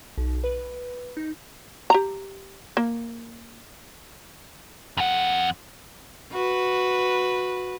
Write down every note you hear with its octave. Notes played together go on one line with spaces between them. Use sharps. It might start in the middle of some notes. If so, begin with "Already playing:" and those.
B1
B4
D#4
G4 A#5
A#3
F2 F#5
F#4 B4